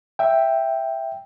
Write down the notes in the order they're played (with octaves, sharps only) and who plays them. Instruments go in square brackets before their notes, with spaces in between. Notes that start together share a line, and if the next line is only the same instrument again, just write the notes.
[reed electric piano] E5 G5